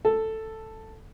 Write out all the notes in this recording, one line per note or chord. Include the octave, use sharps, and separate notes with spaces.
A4